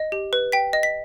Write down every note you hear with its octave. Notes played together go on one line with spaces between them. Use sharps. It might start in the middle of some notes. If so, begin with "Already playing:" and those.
Already playing: D#5
G4
B4
G5 B6
D#5
B6